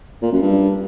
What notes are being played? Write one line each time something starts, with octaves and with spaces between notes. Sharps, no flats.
A#2
F#2
G2